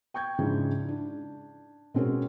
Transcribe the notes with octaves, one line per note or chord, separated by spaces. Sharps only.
G5 C#6 G6 G#6
G#2 C#3 F3 G#3 D4 E4
D4
B2 G#3 C4 C#4 F#4 A#4